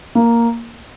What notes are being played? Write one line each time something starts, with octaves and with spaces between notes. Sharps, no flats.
A#3